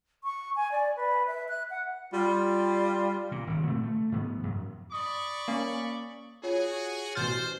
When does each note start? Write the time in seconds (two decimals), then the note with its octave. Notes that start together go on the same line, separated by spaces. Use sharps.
0.24 C#6
0.56 G#5
0.72 D5
0.96 B4
1.27 E5
1.48 F#6
1.70 F#5
2.13 G3 F4
3.32 A#2
3.47 G#1 C#3
3.67 A#2 A3 C4
3.83 A3
4.12 G#2 F3 B3
4.43 F#2
4.92 D5 B5 C#6 D#6
5.48 A#3 C#4
6.43 F4 F#4 G#4 C#5
7.15 A1 B2 C5 F6 G6 A6